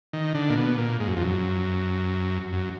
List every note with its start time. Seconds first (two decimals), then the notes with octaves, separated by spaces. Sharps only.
0.13 D#3
0.35 D3
0.50 A#2
0.57 B2
0.78 A#2
1.00 G#2
1.07 F#2
1.16 F2
1.22 F#2
2.53 F#2